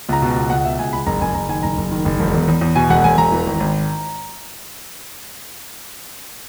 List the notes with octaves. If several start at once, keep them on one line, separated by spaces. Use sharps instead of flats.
C#2 A#5
B2
A#5
C#2
C#2 F#5
B2 E5
C#2 G#5
C#2 B5
F#1 A#5
F#1 G#5
F#1 A#5
D#3 G#5
F#1 A#5
F#1
D#3
F#1
E1
E2
E2
E2
B2 G#5
E1 F#5
E1 G#5
E1 A#5
E3
G#1
G#1